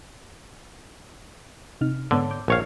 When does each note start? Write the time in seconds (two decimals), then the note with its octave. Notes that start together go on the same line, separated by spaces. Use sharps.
1.81 C3 D#4 F6
2.11 G#2 D3 B3 C#5
2.31 D6 G6
2.48 A#1 C#5 F5